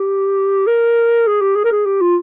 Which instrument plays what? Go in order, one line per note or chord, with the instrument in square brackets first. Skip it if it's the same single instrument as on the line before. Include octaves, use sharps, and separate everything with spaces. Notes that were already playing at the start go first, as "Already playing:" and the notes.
Already playing: [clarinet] G4
A#4
G#4
G4
G#4
A#4
G#4
G4
F4